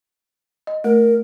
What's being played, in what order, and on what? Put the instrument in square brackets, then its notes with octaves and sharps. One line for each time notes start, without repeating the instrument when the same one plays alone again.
[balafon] D#5
[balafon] A3 [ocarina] A#4